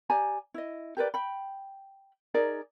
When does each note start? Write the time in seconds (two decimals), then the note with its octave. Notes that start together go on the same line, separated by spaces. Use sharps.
0.10 G4 D5 G#5 A#5
0.54 E4 D#5
0.97 G4 A#4 B4 D5
1.14 G5 B5
2.34 D#4 G#4 A#4 D5